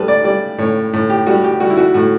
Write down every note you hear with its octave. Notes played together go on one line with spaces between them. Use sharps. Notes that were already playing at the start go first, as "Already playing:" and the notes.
Already playing: A2 G3 A4 B4
D5
G3 D5
A2 C#5
A2
G4
G3 F#4
G4
G3 F#4
E4
F#4
A2 F#4